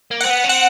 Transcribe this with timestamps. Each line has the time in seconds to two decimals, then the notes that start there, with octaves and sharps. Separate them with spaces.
0.11 A#3
0.21 C4 F#5
0.30 B3
0.44 C#4
0.48 C4 F#5